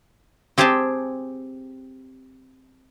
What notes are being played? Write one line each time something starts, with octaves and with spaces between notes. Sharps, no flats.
C4 G4 G#4 G5 A5